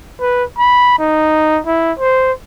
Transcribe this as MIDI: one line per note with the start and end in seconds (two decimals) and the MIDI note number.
0.21 0.44 71
0.58 0.96 83
0.99 1.61 63
1.67 1.92 64
1.99 2.32 72